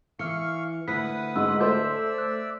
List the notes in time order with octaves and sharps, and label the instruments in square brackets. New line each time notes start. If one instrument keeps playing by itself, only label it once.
[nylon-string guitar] E3 [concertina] F5 C#6 [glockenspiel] F6 C#7
[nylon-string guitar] D2 E4 [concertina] B4 F#5 D#6 [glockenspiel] B6
[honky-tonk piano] G#2 [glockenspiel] E6
[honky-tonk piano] A3 C5 [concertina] D5 E5 [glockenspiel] G6
[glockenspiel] F#6